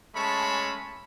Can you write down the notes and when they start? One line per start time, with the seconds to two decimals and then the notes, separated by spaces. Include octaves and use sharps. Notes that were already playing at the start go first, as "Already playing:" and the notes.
0.15 G#3 A3 C#4 A5 B5 C#6